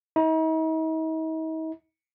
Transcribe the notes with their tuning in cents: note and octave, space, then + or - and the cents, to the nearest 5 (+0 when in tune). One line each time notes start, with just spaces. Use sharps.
D#4 +45